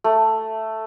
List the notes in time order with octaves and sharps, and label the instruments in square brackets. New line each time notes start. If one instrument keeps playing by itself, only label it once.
[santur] A3